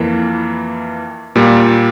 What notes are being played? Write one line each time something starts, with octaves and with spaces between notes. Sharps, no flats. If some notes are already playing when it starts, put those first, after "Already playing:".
Already playing: F2 E3 A#3
A#2 G3 A#3